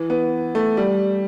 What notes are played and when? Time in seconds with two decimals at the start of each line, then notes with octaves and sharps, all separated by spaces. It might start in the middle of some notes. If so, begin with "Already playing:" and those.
Already playing: E3
0.10 B3
0.55 A3
0.77 G3